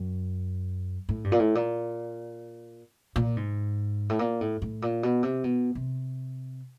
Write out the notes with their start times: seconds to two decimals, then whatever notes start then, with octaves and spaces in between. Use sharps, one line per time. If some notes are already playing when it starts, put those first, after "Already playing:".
Already playing: F#2
1.09 A2
1.24 G2
1.32 A#2
1.39 A2
1.55 A#2
3.16 A#2
3.37 G#2
4.10 A2
4.19 A#2
4.41 A2
4.62 A2
4.82 A#2
5.03 B2
5.23 C3
5.44 B2
5.75 C3